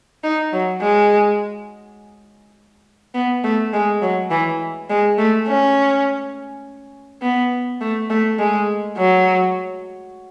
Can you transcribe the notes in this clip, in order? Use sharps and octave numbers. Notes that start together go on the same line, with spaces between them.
D#4
F#3
G#3
B3
A3
G#3
F#3
E3
G#3
A3
C#4
B3
A3
A3
G#3
F#3